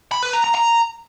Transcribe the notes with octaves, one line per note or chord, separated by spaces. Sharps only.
B5
B4
A#5
A#5
A#5